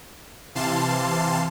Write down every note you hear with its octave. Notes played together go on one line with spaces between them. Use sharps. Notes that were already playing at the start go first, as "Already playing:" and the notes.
C3 E3 F5 A5 C6